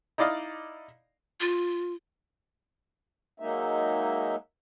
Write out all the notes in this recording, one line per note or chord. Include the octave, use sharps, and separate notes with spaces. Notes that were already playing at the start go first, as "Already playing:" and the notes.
D#4 E4 D5 D#5 F5
F4
F#3 G#3 A#3 D#4 E5